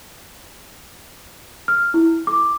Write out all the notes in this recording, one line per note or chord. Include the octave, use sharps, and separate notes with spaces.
F6
E4
D6